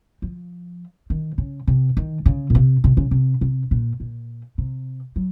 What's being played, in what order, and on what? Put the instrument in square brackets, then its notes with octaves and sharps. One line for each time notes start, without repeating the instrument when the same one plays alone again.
[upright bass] F3
D#3
C#3
C3
D#3
C#3
A#2
C3
C3
C#3
C3
C3
A#2
A#2
C3
F#3